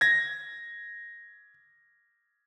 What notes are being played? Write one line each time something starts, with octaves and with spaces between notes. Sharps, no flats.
G#6 A#6